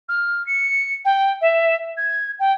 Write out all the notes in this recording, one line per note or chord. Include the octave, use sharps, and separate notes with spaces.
F6
C#7
G5
E5
G#6
G5